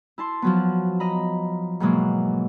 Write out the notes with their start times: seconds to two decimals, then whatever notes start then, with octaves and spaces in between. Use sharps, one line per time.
0.18 E4 A5 C6
0.42 F3 F#3 B3
1.00 D#5 A#5 B5
1.80 G#2 B2 E3 F#3 G#3 A#3